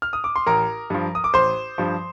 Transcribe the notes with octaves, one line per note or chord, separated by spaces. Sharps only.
F6
D#6
D6
C6
A1 A#4 A#5
G2 F3
D#6
D6
A1 C5 C6
G2 F3